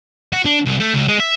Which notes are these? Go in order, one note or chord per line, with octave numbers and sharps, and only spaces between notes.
F#4
D4
C2
A3
C#2
G#3
E5